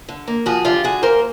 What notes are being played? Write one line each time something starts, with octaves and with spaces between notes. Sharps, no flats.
D3
A#3
F3 F#4 G#4
D3 F4 G4
D3 F#4 G#4
A#3 A#4 C5